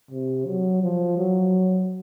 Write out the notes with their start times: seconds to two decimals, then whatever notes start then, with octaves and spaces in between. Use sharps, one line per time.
0.11 C3
0.46 F#3
0.83 F3
1.18 F#3